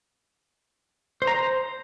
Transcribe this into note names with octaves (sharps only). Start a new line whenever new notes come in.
C5
A#5
C5